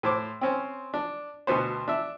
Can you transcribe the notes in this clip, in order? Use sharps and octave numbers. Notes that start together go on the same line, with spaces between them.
A2 C5 D6
C4 C#4 C5
D4
D2 B2 B3 C5
D4 E5